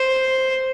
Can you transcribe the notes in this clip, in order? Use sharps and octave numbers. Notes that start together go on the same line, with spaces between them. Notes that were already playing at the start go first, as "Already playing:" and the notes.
Already playing: C5